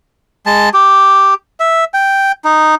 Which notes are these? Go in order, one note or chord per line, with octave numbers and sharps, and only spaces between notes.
G#3 A5
G4
E5
G5
D#4